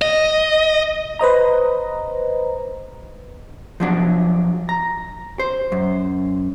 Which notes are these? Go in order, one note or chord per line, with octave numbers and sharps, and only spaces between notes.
D#5
B4 C5 D#5 A#5
F3 F#3 D4
A#5
C5
F#2